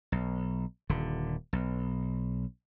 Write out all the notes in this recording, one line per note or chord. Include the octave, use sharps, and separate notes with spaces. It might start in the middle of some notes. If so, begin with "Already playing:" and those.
B1
D#1 D3
B1